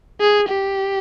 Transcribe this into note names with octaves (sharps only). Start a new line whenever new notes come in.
G#4
G4